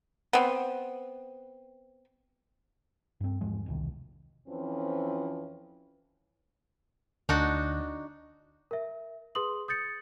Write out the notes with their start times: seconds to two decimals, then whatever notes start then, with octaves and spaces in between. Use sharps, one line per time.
0.33 B3 C4
3.21 G2 C4
3.41 E2 G#2 F3 G#3
3.66 E1 C2 D#3
4.48 F2 E3 F3 C4 C#4
7.29 D2 D4 D#4 F#4
8.71 A#4 E5
9.35 G#4 B4 C6 D#6 F#7
9.68 D#6 G6 A6 C#7